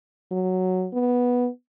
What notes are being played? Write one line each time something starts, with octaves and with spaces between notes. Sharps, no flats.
F#3
B3